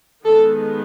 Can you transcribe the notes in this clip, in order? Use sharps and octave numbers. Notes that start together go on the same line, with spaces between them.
D#3 G#3 B3 A4